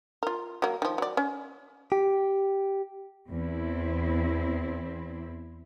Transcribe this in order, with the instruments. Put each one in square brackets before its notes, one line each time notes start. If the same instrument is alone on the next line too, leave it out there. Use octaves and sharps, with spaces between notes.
[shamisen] F4 A#4
F#3 A#3
D#3 F3
F#3 D5
C#4
[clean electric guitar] G4
[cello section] E2 C4 E4